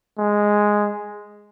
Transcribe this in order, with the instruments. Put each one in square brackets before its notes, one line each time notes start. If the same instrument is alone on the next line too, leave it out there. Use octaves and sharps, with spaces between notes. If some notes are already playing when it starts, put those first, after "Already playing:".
[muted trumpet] G#3